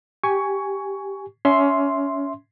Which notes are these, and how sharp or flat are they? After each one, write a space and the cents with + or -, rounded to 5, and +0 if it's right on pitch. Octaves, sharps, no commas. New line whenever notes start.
G4 +0 G#5 +0 C#6 +15
C#4 +25 E5 +0 C6 +0